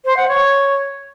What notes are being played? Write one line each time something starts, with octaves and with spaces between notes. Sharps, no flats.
C5
F#5
C#5